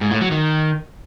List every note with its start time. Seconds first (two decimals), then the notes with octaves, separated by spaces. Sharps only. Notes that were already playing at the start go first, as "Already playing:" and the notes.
0.01 G#2
0.11 A2
0.21 F#3
0.31 D#3